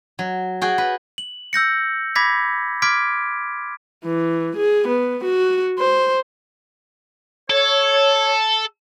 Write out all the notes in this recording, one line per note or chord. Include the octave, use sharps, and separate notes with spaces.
F#3
F#4 G#4 G5
B4
F#7
E6 G6 A#6 C#7
B5 D6 G#6 A#6 B6
C6 D6 F6 G#6 B6 D7
E3
G#4
B3
F#4
C5
A4 C#5